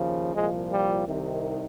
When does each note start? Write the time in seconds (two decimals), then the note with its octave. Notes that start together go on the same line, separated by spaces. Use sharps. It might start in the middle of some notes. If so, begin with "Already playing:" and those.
Already playing: D#2 C#3 F3
0.34 C2 A#2 F3 G#3
0.71 G3
1.07 C2 C3 D#3